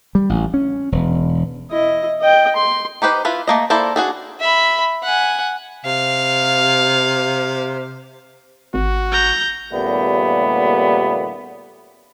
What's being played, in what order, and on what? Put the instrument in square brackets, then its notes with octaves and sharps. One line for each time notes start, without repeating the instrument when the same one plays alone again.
[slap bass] G3
A1
C#4
E1
[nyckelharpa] E4 D#5
D#5 G5
C6
[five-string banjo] D#4 G4 B4 C5
E4 F4 B4
A3 A#3 D#5
A#3 E4 A4 C5 D5
D4 F#4 G#4 A4
[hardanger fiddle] E5 B5
F#5 G#5
[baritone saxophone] C3 [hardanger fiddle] F5
[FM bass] G#1 [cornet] F#4
[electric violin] A#5 G6
[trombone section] D#2 A#2 C#3 G3 A3 B3